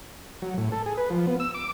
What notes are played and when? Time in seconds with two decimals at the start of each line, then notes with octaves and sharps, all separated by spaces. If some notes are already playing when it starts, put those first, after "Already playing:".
0.42 F#3
0.57 A2
0.72 A4
0.86 G#4
0.97 B4
1.10 F3
1.27 B3
1.40 E6
1.54 D6